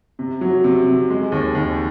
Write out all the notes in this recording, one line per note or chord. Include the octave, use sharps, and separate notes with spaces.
C3
F#3
C3
C3
G#3
D#2
D#2